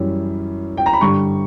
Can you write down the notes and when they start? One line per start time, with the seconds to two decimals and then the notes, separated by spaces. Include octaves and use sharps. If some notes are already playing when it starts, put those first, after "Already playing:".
Already playing: F#2 E3 G3 C#4
0.77 G5
0.86 A#5
0.93 B5
1.01 G2 D3 G3 C#6